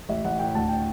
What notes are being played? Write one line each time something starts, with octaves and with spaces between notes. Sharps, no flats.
A1 E5
A1 F#5
A2 G5
D2 A5
G5